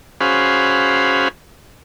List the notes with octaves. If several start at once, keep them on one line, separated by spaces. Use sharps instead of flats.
C#4 F#4 G#4 C5 F5 B5